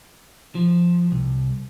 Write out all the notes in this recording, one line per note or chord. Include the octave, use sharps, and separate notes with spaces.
F3
C2